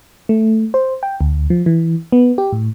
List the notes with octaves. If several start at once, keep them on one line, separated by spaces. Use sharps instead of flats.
A3
C5
G5
D2
F3
E3
B3
G4
A2